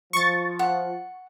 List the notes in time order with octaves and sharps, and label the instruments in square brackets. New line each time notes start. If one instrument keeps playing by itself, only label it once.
[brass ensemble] F3 [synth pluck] C#6 A6
[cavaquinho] F#5